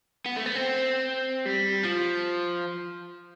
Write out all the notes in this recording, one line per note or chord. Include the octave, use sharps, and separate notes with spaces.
B3
A3
B3
C4
G3
F3